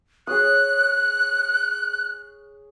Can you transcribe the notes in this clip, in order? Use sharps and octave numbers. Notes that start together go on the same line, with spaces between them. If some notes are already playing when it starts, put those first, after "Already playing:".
G#4 C#5 D#6 F#6